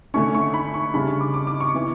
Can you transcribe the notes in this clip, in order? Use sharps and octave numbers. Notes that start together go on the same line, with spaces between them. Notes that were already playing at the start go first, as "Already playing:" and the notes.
D3 A3 C#4 C#6
C#6
B5
C#6
C#3 G3 D4 B5
C#6
D6
D6
D6
C#6
E3 B3 E4